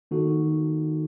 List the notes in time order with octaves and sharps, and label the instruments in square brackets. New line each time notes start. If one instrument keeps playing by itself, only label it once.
[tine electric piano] D#3 A#3 D#4 F#4 A4